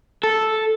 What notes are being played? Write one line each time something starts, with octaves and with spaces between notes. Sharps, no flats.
A4